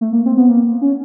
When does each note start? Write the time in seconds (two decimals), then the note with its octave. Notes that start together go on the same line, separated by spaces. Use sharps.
0.01 A3
0.13 A#3
0.26 C4
0.37 B3
0.49 A#3
0.81 C#4